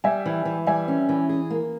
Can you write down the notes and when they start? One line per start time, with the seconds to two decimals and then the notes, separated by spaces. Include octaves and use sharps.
0.04 G3 E5 G#5
0.26 E3
0.45 E3
0.66 G3 E5 G#5
0.88 C#4
1.09 E3
1.29 G#4
1.50 A#3